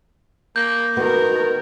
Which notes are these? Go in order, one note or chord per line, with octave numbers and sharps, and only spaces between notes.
A#3 G6
D#3 B3 F#4 A#4